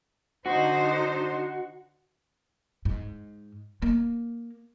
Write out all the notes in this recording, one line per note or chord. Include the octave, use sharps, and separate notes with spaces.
D3 D#4 F#4 C5
G#2
A#3